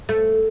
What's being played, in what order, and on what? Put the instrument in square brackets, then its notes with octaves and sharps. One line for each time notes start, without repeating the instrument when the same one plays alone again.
[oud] A3